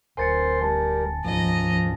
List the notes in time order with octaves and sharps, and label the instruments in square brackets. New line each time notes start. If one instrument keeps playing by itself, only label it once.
[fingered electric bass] D1 [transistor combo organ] A#4 C5 C6 [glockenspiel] G#5 A6 C#7
[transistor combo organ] G3 A#4 [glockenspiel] A5
[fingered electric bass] D1 G#2 [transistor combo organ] F3 [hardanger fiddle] D#5 A#5